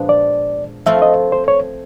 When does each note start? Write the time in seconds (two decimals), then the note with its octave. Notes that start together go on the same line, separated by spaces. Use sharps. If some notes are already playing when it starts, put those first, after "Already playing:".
Already playing: A#2 F3 G#3 B3 D4
0.09 D5
0.86 F3 A3 C4 F4 E5
1.02 D#5
1.32 C5
1.48 C#5